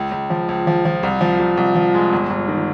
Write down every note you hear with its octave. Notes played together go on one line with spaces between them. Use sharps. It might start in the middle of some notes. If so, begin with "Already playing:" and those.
Already playing: C#2
C#2
F3
C#2
F3
F3
C2
F3
C2
C2
F3
G#3
G1
G1
D#3